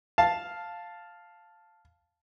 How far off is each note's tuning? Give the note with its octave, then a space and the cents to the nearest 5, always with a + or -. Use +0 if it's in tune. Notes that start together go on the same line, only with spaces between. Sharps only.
F5 +0 A5 +0